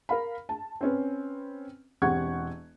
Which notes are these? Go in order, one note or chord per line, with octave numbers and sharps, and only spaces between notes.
A#4 F5 B5
A5
C4 C#4 B4
E1 C4 G4 F#5 C#6 G#6